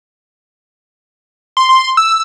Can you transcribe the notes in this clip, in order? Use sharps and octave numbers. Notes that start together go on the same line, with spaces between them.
C6
C6
E6